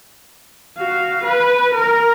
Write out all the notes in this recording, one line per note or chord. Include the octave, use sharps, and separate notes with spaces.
F#4 F5
B4
A#4